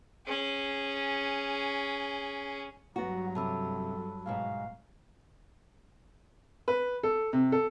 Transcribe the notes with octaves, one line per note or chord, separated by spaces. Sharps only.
C#4 G#4
G2 F#3 B3 F#4 A#5
F#2 C3 A4 A5 B5 E6
G#2 B2 G#3 F5
B4
A4
C3
A4